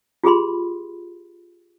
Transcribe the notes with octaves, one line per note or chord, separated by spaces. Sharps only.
F4 G4 G#4 B5 C6